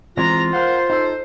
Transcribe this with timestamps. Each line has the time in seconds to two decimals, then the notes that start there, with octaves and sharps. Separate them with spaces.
0.17 E3 G#3 C4 F4 A#5
0.53 A#4 C5 F5 F#5
0.90 D#4 A4 C5